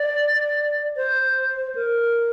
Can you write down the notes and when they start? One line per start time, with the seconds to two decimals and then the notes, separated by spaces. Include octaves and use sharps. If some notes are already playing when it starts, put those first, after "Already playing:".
Already playing: D5
0.96 C5
1.75 A#4